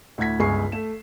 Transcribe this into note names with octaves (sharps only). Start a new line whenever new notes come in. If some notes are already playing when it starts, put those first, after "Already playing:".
D2 A2 F#5 G#6 B6
G1 C#2 G#4 G#5 C#6 C7
A3 E7